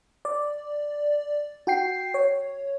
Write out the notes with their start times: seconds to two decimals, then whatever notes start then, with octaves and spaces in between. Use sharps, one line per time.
0.25 D5
1.67 F#4 G5 C7
2.14 C#5